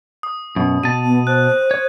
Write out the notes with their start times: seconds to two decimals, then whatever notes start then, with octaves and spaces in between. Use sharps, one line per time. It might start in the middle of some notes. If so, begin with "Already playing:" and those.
0.23 D#6
0.56 F#2 B2
0.83 B2 A5 D#7
1.05 B3
1.27 C5 F#6
1.71 C#5